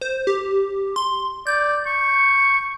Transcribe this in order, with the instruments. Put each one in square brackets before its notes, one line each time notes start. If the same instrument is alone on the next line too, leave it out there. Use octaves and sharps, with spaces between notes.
[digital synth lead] C5
G4
C6
[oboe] D5 [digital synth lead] G6
[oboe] C#6